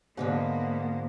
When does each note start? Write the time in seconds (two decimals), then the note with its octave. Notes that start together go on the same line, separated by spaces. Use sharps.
0.17 G#2 D3 F3 A#3 B3